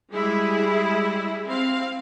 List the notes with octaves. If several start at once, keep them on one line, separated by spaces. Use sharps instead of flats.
G3 G#3 E4 G#4
C4 F5